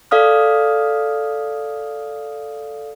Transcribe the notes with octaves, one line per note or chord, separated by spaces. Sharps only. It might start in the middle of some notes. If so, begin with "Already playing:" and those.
A4 D5 F5 D#6 F6